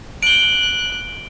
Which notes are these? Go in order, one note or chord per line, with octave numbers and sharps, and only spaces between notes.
F#6 D7 G7